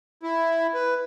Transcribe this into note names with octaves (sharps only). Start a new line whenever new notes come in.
E4
B4